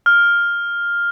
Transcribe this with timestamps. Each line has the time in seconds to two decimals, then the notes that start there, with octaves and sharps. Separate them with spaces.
0.06 F6